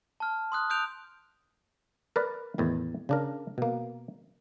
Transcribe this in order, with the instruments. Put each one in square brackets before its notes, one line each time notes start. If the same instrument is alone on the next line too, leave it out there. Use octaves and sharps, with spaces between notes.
[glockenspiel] A5 F6
C6 D#6 F#6
D#6 F#6 G6 D7 F7
[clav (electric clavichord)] A#4 B4 D5
E2 A2 D#3
C#3 D4 A#4
B2 A#3